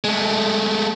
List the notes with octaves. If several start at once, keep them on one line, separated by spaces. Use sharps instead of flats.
G#3 A3